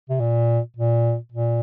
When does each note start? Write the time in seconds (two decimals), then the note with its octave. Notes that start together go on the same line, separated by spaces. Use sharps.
0.10 C3
0.20 A#2
0.77 A#2
1.32 A#2